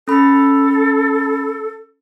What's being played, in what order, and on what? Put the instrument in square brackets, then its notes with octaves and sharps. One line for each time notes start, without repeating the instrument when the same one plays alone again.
[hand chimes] C#4 B5 [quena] A4